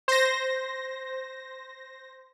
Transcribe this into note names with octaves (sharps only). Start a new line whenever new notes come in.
C5 A#6